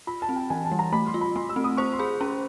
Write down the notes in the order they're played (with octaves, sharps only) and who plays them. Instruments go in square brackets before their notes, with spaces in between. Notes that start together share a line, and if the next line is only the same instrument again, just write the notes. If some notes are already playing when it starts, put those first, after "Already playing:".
[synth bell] F4 [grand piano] B5
[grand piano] A5
[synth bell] C4
[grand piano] G5
[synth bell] E3 [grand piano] G#5
[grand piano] A5
[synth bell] G3
[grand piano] A#5
[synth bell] A3 [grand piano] B5
[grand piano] C6
[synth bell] F4
[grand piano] B5
[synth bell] A3 [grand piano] C6
[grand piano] E6
[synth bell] C4
[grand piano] D#6
[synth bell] C5 [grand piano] C#6
[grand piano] C6
[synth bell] G#4 [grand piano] B5
[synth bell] C#4 [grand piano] A#5